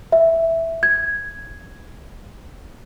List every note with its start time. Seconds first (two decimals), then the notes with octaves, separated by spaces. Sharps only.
0.12 E5
0.83 G#6